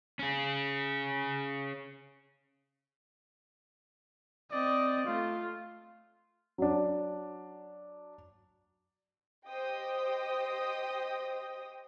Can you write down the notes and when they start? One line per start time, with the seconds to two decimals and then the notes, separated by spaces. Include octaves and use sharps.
0.19 C#4 G#4
4.52 C4 D5 D#5
5.06 A3 F4
6.58 F#3 D4
9.47 G4 C5 D#5 G5 D#6